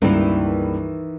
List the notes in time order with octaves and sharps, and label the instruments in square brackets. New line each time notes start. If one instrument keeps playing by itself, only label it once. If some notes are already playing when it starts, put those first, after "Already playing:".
[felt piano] C#2 G2 A#3 [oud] D#3 E3